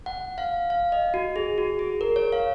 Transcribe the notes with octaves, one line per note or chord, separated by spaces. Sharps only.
F#5
F5
F5
D#5
F#4
G#4
F#4
G#4
A#4
C#5
F5